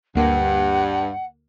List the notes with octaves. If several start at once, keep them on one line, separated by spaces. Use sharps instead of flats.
D2 G2 A#3 F#5